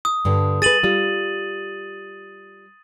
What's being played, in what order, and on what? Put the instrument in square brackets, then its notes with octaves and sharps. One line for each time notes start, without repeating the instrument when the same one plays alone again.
[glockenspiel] D#6
[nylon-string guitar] G2 D3
[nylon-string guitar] G#4 B4 [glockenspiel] A6 D#7 F#7
[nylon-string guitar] G3 F4